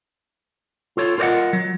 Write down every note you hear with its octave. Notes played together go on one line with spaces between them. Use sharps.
F4 A4 C#5
F4 A#4 C5 D5 D#5 F#5
F#3